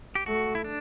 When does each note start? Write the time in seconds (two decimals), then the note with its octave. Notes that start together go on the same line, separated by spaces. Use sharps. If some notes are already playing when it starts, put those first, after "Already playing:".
0.15 G4
0.26 A3 F#4
0.55 E4
0.64 D4